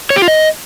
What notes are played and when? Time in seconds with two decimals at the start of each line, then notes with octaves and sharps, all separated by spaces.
0.10 C#5
0.16 G4
0.22 F4
0.28 D#5